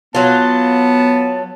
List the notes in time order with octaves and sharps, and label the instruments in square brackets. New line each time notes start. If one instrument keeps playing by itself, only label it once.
[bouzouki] F#3 F4 [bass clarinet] B3 [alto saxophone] A5